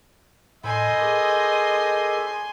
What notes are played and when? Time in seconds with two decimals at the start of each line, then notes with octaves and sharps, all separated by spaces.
0.64 A2 A4 C5 D#5 G#5 B5 C6
1.00 G#4 A#4 D6